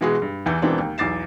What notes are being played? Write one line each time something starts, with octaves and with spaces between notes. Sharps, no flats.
B2 E3 G#3 F#4 G#4
G2
E2 E3 G6
E1 B2 E3 C4 D4
D#2
B1 E2 D6 A6 C7 E7